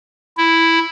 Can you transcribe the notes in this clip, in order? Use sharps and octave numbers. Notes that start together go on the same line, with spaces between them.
E4